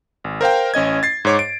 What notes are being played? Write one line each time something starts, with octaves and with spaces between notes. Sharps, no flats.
G#1
A#4 C5 F5 G5
A1 C#4 D#5 G#6
A6 C7
G#2 C#5 D6
D7